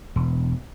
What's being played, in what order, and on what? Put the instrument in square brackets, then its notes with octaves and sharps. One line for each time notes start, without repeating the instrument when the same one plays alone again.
[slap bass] E1